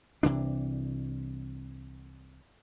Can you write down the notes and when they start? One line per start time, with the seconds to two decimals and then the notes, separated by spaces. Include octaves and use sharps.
0.23 C2 C3 E3 D4